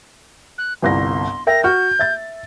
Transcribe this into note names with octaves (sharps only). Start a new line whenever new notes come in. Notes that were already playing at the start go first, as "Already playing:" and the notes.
F#6
G1 C2 C6 A#6
A#4 E5 G5 A#6
F#4 F6 G6
E5 A6